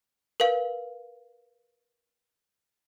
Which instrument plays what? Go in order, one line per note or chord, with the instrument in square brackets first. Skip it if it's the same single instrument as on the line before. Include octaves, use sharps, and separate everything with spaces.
[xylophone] A#4 B4 F5